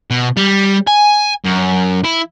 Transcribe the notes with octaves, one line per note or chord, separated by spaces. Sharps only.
B2
G3
G#5
F#2
E4